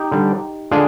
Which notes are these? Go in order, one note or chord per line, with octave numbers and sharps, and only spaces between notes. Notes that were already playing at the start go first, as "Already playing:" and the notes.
Already playing: D#4 G4
D3 G3 D4
D3 G#3 D4 F4 G#4